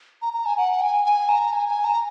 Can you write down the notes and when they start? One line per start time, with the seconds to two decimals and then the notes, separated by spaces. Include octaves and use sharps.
0.22 A#5
0.33 A#5
0.46 G#5
0.57 F#5
0.81 G#5
1.06 G#5
1.29 A#5
1.53 G#5
1.68 G#5
1.84 A#5